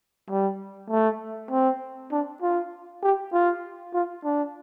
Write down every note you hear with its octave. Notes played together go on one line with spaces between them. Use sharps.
G3
A3
C4
D4
F4
G4
F4
F4
D4